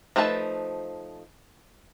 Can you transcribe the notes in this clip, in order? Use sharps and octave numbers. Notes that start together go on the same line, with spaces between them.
F3 A3 D#4 B4 A5